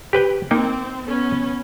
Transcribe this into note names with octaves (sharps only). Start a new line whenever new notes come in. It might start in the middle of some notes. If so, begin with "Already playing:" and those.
G4 B4 G5
A#3 C4 D#4 G5
B3 C#4